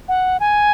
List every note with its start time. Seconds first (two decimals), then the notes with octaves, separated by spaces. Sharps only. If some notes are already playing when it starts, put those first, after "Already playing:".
0.08 F#5
0.40 G#5